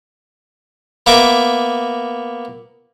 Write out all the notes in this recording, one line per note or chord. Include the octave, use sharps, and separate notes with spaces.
A#3 B3 E5 A#5 D6